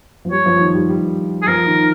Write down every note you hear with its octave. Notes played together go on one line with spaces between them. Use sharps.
F3
G3 C#5
F3
D#3
G3
G3
G#4
F3 A#4
D#3